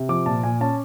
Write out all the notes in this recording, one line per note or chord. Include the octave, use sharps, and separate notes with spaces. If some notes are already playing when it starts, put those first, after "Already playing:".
Already playing: C3
F3 D6
A#2 A5
A#2 G#5
C#4 A5